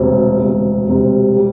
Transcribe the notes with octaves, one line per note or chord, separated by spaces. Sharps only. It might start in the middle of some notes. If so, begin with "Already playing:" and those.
Already playing: E1 D2 C3 G3
E1 D2 C3 G3
E1 D2 C3 G3
G3